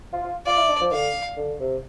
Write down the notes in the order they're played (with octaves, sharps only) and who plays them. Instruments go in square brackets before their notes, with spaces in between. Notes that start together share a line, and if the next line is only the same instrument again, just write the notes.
[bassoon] F4
F4
[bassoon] F4 [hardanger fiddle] D5
[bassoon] E4
D4
F3
[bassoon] D3 [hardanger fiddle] F5
[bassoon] D3
C3